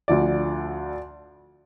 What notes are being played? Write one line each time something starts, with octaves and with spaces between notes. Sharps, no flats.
D2 D3 F3 D5